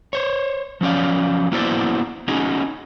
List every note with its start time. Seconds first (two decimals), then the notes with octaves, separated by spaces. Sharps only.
0.13 C5 C#5
0.81 F3 F#3 C#4 D5 F5
1.52 A#3 B3 E4 F#4 C5 D5
2.28 C#4 D#4 F#4 G#4